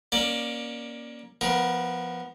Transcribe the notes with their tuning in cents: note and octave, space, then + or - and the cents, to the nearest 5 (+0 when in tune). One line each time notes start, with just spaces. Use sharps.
A#3 +20 C#4 +0 D5 +15
F3 +0 B3 +0 A#4 +25